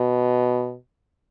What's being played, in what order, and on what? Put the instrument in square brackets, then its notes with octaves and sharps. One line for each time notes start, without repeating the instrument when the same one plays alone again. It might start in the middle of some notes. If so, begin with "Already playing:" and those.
Already playing: [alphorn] B2